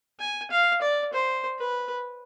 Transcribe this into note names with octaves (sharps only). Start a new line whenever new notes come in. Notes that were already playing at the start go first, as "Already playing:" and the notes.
G#5
F5
D5
C5
B4